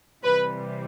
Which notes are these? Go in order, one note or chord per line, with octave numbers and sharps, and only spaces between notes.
C3 E3 G3 B4